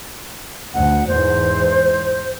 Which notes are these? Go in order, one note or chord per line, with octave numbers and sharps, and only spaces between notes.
D2 F#5
E2 G#2 E3 C5